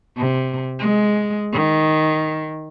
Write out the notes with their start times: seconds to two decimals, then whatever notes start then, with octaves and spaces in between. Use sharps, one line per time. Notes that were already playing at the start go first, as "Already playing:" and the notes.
0.18 C3
0.80 G#3
1.53 D#3